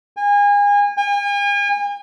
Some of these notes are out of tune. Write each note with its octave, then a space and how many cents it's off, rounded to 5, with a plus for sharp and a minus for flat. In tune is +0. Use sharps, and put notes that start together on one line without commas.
G#5 -30
G#5 -40